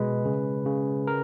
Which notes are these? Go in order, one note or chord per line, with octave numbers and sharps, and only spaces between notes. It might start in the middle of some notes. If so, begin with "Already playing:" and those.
Already playing: B2 G#3 B4
C#3
C#3
A#4